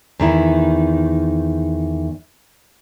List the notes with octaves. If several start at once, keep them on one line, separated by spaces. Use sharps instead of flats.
E2 D#3 E4